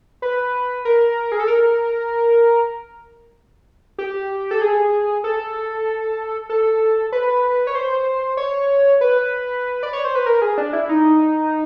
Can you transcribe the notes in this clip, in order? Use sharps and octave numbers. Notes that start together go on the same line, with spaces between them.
B4
A#4
G#4
A4
A#4
G4
A4
G#4
A4
A4
B4
C#5
C5
C#5
B4
D5
C#5
C5
B4
A#4
G#4
D4
E4
D#4